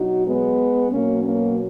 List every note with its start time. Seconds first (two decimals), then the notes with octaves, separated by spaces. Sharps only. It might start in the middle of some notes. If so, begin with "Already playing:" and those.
Already playing: B2 F#3 D#4 F#4
0.25 G#3 B3
0.89 B2 F#3 A#3 C#4
1.22 A#3 C#4